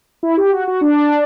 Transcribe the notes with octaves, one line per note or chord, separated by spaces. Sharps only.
E4
G4
F#4
F#4
D4